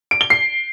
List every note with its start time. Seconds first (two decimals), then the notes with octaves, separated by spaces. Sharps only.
0.11 D7
0.21 G7
0.30 C7